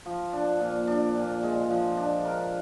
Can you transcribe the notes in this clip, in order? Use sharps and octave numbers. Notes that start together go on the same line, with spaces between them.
F3
D4
A#2
D4
A#2
G#3
F3
D4
A#4